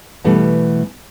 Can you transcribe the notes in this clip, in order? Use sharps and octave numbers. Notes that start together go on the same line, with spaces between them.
B2 E3 G3 A3 B3